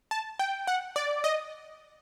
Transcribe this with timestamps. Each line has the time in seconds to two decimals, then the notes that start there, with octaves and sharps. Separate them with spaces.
0.11 A5
0.39 G5
0.67 F#5
0.96 D5
1.24 D#5